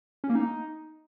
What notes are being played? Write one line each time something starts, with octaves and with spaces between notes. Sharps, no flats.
C#4
A#3
D#4